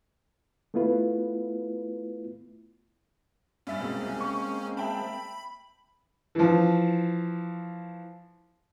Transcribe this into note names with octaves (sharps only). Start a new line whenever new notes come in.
A3 B3 E4 F4 B4
G2 C#4 E5 A6
B2 G#3 A#3 C4
C2
C#6
E5 G5 A5 B5
E3 F3